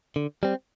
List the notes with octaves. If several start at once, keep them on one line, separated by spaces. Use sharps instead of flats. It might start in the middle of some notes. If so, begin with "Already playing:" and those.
D3
G3 C4